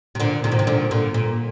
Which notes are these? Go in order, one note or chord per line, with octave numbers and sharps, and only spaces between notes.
C3
A#2 D3
C3 D#3
A#2
C3
A#2 D3
A#2 D3
A#2